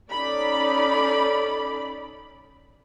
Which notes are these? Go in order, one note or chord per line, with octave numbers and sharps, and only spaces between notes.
C#4 D#4 A4 D5 B5